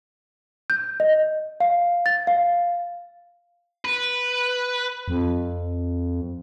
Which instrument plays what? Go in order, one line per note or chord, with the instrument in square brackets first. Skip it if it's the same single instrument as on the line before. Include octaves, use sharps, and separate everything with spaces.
[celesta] G6
D#5
F5
A6
F5
[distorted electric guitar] B4
[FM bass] F2